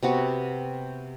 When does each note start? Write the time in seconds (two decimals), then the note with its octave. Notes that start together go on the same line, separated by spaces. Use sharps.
0.03 C3 B3 F#4